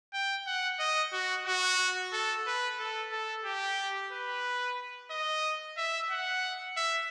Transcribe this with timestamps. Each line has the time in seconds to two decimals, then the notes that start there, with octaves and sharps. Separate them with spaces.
0.13 G5
0.47 F#5
0.79 D#5
1.12 F#4
1.46 F#4
2.13 A4
2.46 B4
2.79 A4
3.12 A4
3.45 G4
4.12 B4
5.11 D#5
5.77 E5
6.11 F#5
6.77 E5